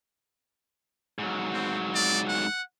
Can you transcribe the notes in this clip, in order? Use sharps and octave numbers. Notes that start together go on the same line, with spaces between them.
G#2 F#3
C4
D5
F#5